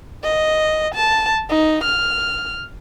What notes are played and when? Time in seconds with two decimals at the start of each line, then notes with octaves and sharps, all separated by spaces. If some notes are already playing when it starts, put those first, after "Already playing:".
0.23 D#5
0.95 A5
1.50 D#4
1.83 F6